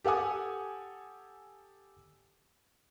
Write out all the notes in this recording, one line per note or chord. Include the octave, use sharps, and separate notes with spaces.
G4 A4 F#5 G#5 D#6